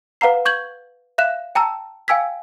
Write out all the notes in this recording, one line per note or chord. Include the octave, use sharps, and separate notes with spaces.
B4 F5 F#5 A#5 C7
C#6 G6 G#6 F#7
E5 F5 F#6 E7
G5 A5 A#5 E6
F5 G5 G#5 E6 G#6 B6